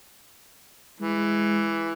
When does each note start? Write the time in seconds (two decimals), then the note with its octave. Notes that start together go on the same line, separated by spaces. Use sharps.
1.00 E3 G#3